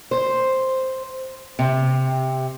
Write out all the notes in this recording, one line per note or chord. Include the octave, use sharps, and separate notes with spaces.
C5
C3